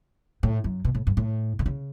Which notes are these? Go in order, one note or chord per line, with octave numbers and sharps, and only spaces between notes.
A2
F#2
B2
A2
G2
A2
D3
C#3